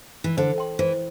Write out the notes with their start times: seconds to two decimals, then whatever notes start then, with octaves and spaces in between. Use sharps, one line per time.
0.24 E3
0.37 D3 C5
0.58 G5 C6
0.79 E3 C5